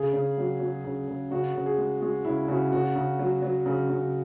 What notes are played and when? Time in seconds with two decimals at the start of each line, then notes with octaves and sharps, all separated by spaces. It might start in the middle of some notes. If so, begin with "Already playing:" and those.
Already playing: C#3 G#4
0.13 C#3
0.38 F#3
0.60 F#3
0.84 C#3
1.08 C#3
1.31 C#3 F#4
1.54 C#3
1.66 G#4
1.78 G#3
2.01 G#3 F#4
2.25 C#3 E4
2.48 C#3 F#4
2.72 C#3 F#4
2.96 C#3
3.19 F#3
3.42 F#3
3.66 C#3
3.89 C#3